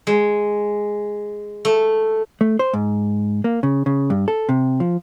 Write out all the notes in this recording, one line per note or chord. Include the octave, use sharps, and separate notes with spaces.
G#3
A3
A3
C5
G#2
A#3
C#3
C#3
G2
A4
C3
F3